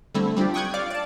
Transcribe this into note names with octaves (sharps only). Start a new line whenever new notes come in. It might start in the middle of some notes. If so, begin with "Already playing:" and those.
D3 G3 A3 C4 E4
G3 C4 D4 F4 G4
G5 C#6 D#6 F#6 G#6
D5 F5 D6
D5 A5